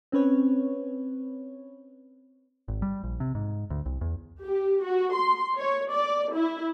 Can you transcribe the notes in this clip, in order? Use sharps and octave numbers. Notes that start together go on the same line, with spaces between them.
C4 C#4 B4 C#5
G#1
G3
A#1
C3
G#2
D2
C2
E2
G4
F#4
C6
C#5
D5
E4